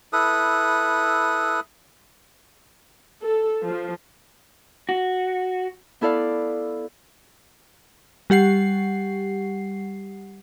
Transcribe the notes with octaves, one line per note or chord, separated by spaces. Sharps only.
E4 A4 B4 D#6
A4
F3
F#4
B3 E4 A4 D5 F5
G3 G4 F#5 C7